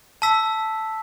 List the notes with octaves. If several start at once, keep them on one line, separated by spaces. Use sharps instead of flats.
A5 E6 B6